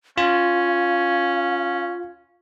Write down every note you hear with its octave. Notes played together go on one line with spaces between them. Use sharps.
C#4 F4 F5